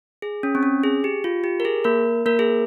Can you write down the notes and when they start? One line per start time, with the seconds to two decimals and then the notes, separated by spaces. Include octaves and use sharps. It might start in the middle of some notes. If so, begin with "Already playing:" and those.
0.22 G#4
0.43 C#4
0.55 C4
0.63 C#4
0.83 G#4
1.04 G4
1.24 F4
1.44 G4
1.60 A#4
1.65 G#4
1.84 A#3 A#4
2.26 A#3 A#4
2.39 G#4